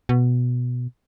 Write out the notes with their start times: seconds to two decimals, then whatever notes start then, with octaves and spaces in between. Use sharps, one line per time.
0.09 B2